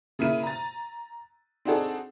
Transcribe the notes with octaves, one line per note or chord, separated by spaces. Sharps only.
C#3 A#3 E4 D#7
A#5 A6
C4 D4 D#4 F#4 G#4 A4